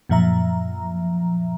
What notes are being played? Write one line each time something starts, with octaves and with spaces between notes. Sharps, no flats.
F#2 A#2 F3 E5 A#5